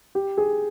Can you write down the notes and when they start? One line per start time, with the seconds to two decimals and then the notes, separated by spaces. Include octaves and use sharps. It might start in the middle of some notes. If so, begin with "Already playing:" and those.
0.15 G4
0.38 G#4